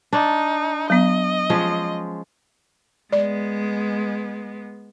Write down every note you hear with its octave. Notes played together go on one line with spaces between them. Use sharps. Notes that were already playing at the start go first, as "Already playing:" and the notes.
D4 D#4
F#3 B3 D#5
F3 G#3 C#4
G#3 B3 D5